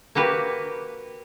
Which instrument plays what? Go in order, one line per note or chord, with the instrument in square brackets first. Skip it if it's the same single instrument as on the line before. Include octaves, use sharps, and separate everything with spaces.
[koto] A#3 F#4 G4 B4